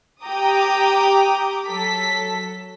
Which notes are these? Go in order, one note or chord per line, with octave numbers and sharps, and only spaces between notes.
G4 G5 A#5 D6 D#6
F#3 A4 B6